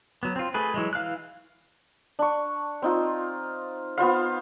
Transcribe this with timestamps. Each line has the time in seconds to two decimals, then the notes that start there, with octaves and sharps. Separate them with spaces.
0.23 F#3 B3
0.36 C4 F4
0.54 A3 G#4 B4
0.74 E3 F#3 G#3
0.93 E3 F5 F6 F#6
2.19 D4 C#6
2.82 C4 D#4 F4
3.98 B3 F4 C5 F5